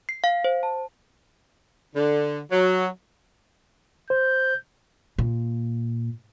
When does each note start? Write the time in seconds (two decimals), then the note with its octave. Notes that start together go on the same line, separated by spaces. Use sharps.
0.09 C7
0.24 F5
0.44 C5
0.63 A5
1.96 D3
2.52 F#3
4.10 C5 G6
5.18 A#2